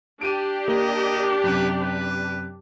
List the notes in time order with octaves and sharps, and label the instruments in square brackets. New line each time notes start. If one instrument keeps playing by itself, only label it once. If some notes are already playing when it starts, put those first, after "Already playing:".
[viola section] D4 G4 [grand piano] D7 D#7
[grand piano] A#3 [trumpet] D#5
[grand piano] F#2 C3 [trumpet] B4
[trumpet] B4